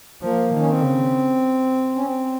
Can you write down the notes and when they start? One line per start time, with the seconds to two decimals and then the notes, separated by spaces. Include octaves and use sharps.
0.22 F3 A#3
0.53 D#3
0.60 C#4
0.68 C4
0.83 C#3
1.96 C#4
2.05 C4